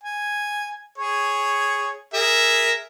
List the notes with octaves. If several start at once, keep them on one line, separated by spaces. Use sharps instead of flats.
G#5
G#4 C#5
G#4 A#4 E5